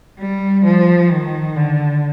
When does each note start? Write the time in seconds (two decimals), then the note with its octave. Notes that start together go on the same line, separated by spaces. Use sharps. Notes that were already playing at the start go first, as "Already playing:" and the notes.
0.19 G3
0.65 F3
1.10 D#3
1.56 D3